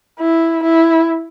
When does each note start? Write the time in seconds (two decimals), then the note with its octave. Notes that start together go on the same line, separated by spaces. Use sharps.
0.20 E4
0.64 E4